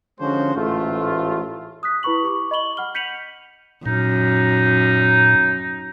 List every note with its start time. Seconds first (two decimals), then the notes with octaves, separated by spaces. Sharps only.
0.20 D3 F3 G#3 C#4 F#4 C5
0.55 A1 G#2 A3 F4
1.83 D#6 F#6 B6
2.03 E4 B4 B5 C#6 F#7
2.23 G4 C#6 D6
2.51 D#5 B5 C#6 F#7 G7
2.77 F#5 B5 F6 G7
2.95 G6 B6 C#7 D#7 F7 F#7
3.86 F#2 A#2 D#4